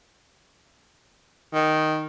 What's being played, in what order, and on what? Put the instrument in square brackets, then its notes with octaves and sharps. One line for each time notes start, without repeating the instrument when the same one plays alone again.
[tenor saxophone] D#3